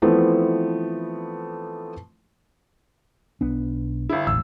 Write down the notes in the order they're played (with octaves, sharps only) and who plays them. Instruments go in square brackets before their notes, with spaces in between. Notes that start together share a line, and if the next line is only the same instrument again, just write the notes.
[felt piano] E3 F3 A3 B3 C4 E4
[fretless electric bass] B1 B3 D4
[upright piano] G1 E4
[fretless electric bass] E1 A1 [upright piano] E6